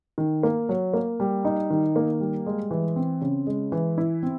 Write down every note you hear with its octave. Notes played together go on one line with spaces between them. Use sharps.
D#3
A#3
F#3
A#3
G3
D#4
D#3
A#3
G3
G#3
E3
C4
C#3
G#3
E3
E4
C4